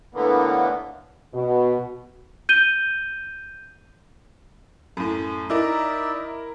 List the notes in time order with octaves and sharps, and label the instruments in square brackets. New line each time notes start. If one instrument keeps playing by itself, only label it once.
[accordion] A2 D3 E3 A#3 B3
[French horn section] B2
[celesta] G6 D#7 G7
[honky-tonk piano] F#2 A2
[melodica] D#4 D5 E5 [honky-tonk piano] E4 A#4